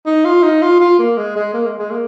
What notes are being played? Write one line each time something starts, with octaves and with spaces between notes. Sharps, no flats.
D#4
F4
D#4
F4
F4
A#3
G#3
G#3
A#3
G#3
G#3
A#3